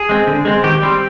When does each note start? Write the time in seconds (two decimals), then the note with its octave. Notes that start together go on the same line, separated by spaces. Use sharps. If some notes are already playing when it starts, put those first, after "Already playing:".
Already playing: G#4
0.09 G#3 C4
0.27 D3
0.45 G#3 C4
0.64 D#3 G4
0.82 G3 C4